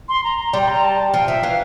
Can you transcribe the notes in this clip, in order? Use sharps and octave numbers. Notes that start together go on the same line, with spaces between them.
C6
A#5
A#5
G3 C6
A#5
A5
F3 G5
F3 E5
E3 F5